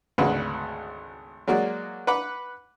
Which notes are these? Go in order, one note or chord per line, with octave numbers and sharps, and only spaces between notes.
G#1 D2 C#3 F#4 B4
F#3 G#3 A#3 F#4 D5
B4 F#5 B5 D6